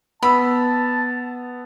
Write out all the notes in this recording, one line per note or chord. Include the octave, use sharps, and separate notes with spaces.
B3 A5 B5 E6